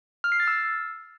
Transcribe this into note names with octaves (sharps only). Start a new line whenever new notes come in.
F6
C7
A6
E6